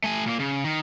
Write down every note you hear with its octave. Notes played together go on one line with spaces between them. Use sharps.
A3 G#5
A#2 A#3
C#3
D#3